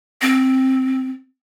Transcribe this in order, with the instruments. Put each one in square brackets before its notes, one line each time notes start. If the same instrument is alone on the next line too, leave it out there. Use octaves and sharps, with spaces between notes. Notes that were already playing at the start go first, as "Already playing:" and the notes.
[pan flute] C4